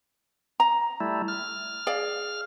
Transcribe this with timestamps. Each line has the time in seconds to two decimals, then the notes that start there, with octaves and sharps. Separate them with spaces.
0.60 A#5
1.00 G3 A3 E4
1.28 F6
1.87 G#4 D5 F5